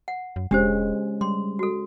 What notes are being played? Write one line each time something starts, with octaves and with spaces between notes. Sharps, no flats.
F#5
F#2
E1 G#3 C#4 D4 G4 C5
G3 C6
F#4 A4